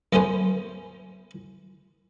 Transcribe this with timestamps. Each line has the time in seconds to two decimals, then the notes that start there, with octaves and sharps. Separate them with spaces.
0.13 F#2 A3 B3 C#4 C5